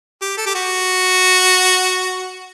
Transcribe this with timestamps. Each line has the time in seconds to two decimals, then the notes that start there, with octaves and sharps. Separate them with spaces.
0.22 G4
0.37 A4
0.46 G4
0.55 F#4